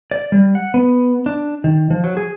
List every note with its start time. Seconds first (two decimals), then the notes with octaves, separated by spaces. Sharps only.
0.11 D5
0.32 G3
0.55 F#5
0.74 B3
1.26 D4
1.64 D#3
1.90 F3
2.04 F#3
2.17 G#4